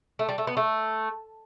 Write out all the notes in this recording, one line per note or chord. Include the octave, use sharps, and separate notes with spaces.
A3
G3
A3
B3
A3